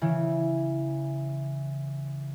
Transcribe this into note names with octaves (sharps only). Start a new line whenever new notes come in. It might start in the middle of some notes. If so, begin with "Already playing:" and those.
C#3 E3